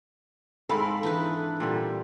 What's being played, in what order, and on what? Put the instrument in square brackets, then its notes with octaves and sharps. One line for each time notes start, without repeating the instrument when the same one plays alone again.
[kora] G#2 C4 [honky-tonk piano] A4 B5 [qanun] A#4 F5
[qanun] E3 D#4 B4 [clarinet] D4
[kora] A#2 D3 G3